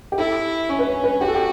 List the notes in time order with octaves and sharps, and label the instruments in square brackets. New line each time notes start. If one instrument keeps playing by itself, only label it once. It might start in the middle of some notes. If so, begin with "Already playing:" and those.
[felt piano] G4
[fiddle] E4 [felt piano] A4
[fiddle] C#4 [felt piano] C#5
[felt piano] B4
C#5
B4
[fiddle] F#4 [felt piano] G4
[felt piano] A4
G4